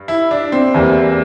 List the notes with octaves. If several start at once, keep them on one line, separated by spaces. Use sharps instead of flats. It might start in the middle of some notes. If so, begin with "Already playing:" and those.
Already playing: G2
E4
D4
C4
E2 E3 G3 A#3